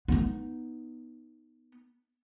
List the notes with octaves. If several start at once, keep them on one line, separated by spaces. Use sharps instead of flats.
B3 D#4